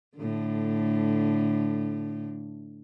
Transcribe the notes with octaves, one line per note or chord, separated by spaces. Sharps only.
A2 D3